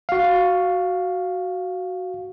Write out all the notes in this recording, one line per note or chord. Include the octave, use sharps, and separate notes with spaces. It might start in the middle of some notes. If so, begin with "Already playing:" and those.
F#4 F5